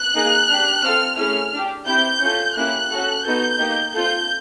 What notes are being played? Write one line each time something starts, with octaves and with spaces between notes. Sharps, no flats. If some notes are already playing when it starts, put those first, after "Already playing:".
Already playing: F#6
A#3 D#4 G#4
D4 G4
C4 F4 A4 F6
A3 C#4 E4 G#4 F6
D4 G4
C4 E4 G4 G6
C#4 F4 A4
A#3 C#4 E4 G4 F#6
C#4 F#4 A4
B3 D#4 F#4 A4 G6
A#3 D#4 G4
C4 F4 A4 G6